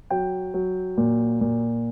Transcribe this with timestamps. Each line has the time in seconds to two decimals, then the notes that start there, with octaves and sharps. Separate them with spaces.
0.10 F#3 G5
0.54 F#3
0.97 A#2
1.41 A#2